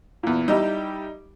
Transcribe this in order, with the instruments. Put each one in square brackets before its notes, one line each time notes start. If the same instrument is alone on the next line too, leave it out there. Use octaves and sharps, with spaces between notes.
[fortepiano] E2 A#2
[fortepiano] G3 E4 G4 [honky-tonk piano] D#4